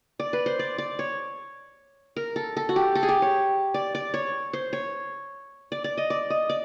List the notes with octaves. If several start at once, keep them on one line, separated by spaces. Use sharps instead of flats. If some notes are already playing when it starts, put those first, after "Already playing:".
D5
B4
C5
D5
D5
C#5
A#4
A4
A4
F#4
G4
A4
G#4
G4
C#5
D5
D5
C#5
C5
C#5
D5
D5
D#5
D5
D#5
D5